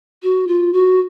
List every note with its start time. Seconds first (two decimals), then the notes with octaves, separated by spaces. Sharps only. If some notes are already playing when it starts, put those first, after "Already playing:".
0.23 F#4
0.48 F4
0.73 F#4